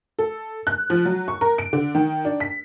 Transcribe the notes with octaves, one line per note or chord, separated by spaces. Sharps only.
A4
F#6
F3
F#3
C#6
A#4
D7
D3
D#3
D4
B6